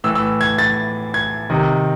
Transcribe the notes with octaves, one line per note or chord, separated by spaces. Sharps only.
A2 E3 E6
E6
G#6
A6
G#6
C3 D#3